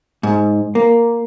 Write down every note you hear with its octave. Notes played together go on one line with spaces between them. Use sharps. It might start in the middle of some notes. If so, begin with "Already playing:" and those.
G#2
A#3